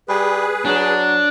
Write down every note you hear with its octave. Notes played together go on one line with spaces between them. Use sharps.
G3 G#4 B4
F#3 D4